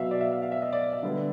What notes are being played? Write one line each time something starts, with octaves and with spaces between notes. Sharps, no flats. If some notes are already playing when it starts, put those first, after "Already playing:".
Already playing: B2 F#3 B3 E5 F5
D5
E5
F5
F5
E5
D#5
D5
E5
D3 G3 B3